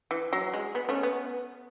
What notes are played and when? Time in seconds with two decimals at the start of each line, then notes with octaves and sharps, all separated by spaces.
0.11 E3
0.33 F#3
0.53 G#3
0.75 B3
0.89 A3 C#4
1.03 B3